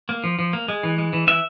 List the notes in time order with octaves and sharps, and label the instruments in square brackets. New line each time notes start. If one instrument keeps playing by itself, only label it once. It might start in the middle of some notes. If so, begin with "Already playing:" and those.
[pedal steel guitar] A#3
F3
F3
A#3
G#3
E3
G#3
E3
E3 E5